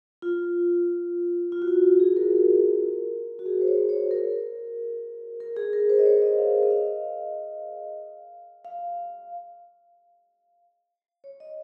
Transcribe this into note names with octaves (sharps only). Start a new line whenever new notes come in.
F4
F4
F#4
F4
F#4
G#4
A#4
F#4
G#4
C5
C#5
C#5
A#4
A#4
G#4
A#4
C5
D#5
C#5
D#5
F5
D#5
F5
F5
C#5
D#5